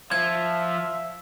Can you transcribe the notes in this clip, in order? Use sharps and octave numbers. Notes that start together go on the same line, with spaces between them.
F3 E5 G#6